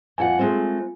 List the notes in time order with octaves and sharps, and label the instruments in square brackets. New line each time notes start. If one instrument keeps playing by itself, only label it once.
[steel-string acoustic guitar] F2 F#4 F#5 [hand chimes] F4 G#5
[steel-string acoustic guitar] G#3 A3 C4